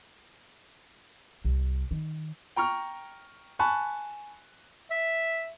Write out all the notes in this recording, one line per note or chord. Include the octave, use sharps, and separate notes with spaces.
C2
D#3
G5 A#5 C#6 F6
G#5 A5 B5 C#6 F#6
E5